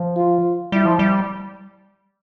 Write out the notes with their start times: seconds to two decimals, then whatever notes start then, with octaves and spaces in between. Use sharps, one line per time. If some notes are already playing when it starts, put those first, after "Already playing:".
Already playing: F3
0.17 F4
0.72 G3 E4
0.86 F3
0.99 G3